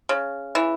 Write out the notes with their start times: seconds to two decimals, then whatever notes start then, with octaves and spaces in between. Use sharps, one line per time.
0.09 C#3
0.55 E3